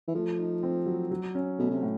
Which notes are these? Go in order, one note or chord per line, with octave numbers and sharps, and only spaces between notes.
E3
F3 A3
D#4
C4
F#3
F#3
C#4
B2 A3
B2
C3
A2